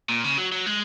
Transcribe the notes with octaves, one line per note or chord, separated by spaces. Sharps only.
A#2
C#3
F#3
F#3
G#3